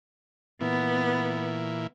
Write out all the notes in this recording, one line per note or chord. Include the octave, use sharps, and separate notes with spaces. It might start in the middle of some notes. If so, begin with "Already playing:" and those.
A#2 E3 B3